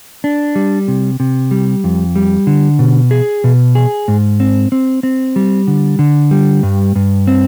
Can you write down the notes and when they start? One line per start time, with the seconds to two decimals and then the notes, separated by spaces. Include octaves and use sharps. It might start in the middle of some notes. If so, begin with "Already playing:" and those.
0.24 D4
0.56 G3
0.88 C3
1.20 C3
1.51 G3
1.84 F2
2.16 G3
2.47 D3
2.79 B2
3.11 G#4
3.44 B2
3.75 G#4
4.08 G#2
4.40 C4
4.72 C4
5.03 C4
5.36 G3
5.68 D3
5.99 D3
6.31 G3
6.63 G2
6.96 G2
7.27 C4